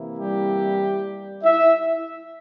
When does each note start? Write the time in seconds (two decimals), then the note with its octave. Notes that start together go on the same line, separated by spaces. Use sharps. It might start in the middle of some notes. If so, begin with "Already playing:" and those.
Already playing: C3 E3 A#3 E4
0.18 G3 G4
1.44 E4 E5